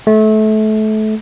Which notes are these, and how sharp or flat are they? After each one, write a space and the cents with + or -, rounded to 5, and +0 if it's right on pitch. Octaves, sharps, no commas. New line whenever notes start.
A3 -25